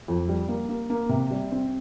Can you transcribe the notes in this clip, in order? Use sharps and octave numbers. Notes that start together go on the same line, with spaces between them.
F2
G3
A#3
A#3
A#3
C3
G3
C4